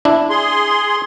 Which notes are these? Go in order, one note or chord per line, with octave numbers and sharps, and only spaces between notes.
D4 E4
G#4 C6